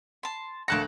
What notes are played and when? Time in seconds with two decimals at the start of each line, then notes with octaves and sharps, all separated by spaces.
0.23 A5 C6
0.68 D2 A#3 A5 C#6 F#6 A#6